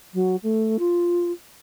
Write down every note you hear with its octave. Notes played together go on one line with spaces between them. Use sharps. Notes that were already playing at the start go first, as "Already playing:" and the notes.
F#3
A3
F4